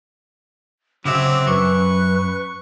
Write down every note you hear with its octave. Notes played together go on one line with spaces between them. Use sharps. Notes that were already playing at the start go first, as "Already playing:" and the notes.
C#3 F#3 C4 E5 D6
F#2 B4 C#6